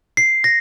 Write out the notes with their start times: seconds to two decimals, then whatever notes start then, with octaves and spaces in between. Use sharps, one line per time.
0.17 C7
0.44 A#6